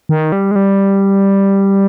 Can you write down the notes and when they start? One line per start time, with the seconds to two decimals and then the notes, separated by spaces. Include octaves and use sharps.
0.09 D#3
0.32 G3
0.51 G#3
0.56 G3